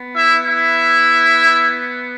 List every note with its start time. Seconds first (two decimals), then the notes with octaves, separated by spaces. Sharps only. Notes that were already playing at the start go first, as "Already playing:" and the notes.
Already playing: B3
0.14 E4 E5
0.46 E4 E5